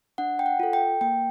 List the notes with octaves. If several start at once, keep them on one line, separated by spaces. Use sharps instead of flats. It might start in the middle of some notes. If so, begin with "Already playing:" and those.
D4 F#5
G5
F#5
F4 A4
G5
A#3 G5